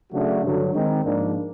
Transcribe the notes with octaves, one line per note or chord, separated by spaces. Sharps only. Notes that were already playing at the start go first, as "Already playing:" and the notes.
C#3 F#3 A3 D4 F#4
G2 D3 F#3
D#3 G#3 C4 D#4
G#2 F3 A#3 D4